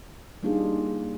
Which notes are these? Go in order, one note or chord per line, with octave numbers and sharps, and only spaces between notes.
G3 A#3 D4 D#4 F4 G#4